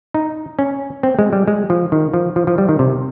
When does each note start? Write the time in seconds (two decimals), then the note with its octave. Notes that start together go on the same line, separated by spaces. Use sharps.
0.14 D#4
0.59 C#4
1.03 C4
1.19 G#3
1.33 G3
1.48 G#3
1.70 F3
1.92 D#3
2.14 F3
2.36 F3
2.47 F3
2.58 G3
2.69 D#3
2.79 C3